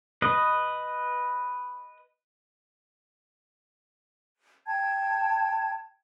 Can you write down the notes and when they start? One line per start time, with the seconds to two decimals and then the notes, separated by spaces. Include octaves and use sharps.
0.22 B4 D#5
4.67 G5 A5 G#6